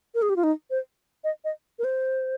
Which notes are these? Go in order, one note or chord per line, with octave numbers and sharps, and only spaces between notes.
A#4
G#4
G4
F4
D#4
C5
D#5
D#5
A#4
C5